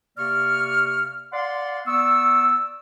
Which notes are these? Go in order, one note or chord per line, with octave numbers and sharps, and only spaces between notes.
C3 A#3 D5 C#6 F6
D5 F5 F#5 C6
B3 D5 C#6 E6